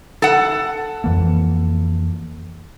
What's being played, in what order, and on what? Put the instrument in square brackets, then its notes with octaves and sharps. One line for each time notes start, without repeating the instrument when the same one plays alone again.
[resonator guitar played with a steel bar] A4 F#5
[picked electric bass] F2 E3 A#3